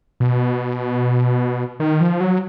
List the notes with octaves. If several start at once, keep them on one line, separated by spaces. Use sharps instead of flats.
B2
D#3
F3
F#3